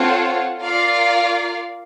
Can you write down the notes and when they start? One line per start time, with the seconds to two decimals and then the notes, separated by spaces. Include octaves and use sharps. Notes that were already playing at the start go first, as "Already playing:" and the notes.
Already playing: C4 F4 A4 C#5 F#5
0.60 F4 A#4 D5 F5